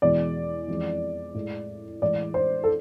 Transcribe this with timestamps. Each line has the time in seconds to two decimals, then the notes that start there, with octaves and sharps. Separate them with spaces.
0.02 E2 B2 G#3 D5
0.68 F2 E3 G#3
1.34 A2 G#3
2.02 A2 E3 G#3 D5
2.34 C5
2.64 A4